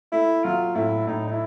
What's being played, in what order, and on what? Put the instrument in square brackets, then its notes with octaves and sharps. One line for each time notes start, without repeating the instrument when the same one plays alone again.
[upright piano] A3 [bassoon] E4
[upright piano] F#3 [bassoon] F4
[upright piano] A2 [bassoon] E4
[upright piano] A2 [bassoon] D#4
[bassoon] D#4
E4